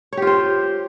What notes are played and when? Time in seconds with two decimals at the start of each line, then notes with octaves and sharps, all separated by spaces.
0.13 C#5
0.17 G4
0.22 F4
0.27 C5